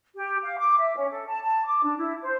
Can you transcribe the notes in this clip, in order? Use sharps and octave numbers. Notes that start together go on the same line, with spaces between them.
G4
F5
D6
E5
C#4
A4
A5
A5
D6
D4
E4
C5